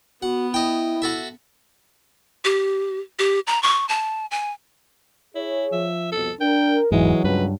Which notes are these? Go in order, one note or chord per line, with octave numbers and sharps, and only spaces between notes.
B3 F#4 F#5
E4 D#5 G5
F#4 A4 E5
G4
G4
A#5
C#6
A5
G#5
E4 G#4 C#5
F3 E5
C2 F2 B2 A4
D4 A#4 G5
F#1 E2 G#2 E3 F#3 G#3
C#2 G2 B4